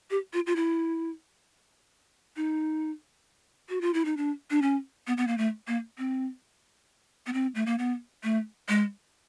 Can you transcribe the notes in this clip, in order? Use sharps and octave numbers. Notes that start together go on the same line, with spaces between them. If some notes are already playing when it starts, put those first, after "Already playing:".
G4
F4
F4
E4
D#4
F#4
F4
E4
D#4
D4
D4
C#4
B3
B3
A#3
A3
A#3
C4
B3
C4
A3
A#3
B3
A3
G#3